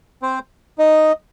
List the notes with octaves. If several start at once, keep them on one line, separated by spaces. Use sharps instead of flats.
C4 C5
D#4 D#5